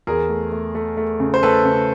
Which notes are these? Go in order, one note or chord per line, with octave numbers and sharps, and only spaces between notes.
E2 G#4 A#4
A3
A3
A3
A3
C#3
C5
A3 A4 B4
C#3